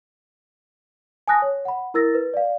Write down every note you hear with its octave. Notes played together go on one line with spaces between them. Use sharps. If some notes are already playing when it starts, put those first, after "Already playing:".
G#5 A5 D#6 F#6 A#6
C#5
F#5 B5
E4 A#4 E6 A6 A#6
B4
D5 F5